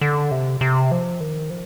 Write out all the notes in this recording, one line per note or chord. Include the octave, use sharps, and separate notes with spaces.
D3
C3
C3
F3
D#3
F3